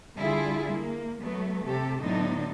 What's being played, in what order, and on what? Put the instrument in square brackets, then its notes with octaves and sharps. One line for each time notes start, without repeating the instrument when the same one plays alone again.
[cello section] D3 G3 E4 F4 G#4
A#3
F#3 A3 B3
C3 G4 A4
A2 D3 F#3 B3 D4 D#4